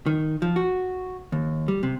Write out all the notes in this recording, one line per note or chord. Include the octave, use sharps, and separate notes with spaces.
D#3
F3
F#4
D#2
G3
C3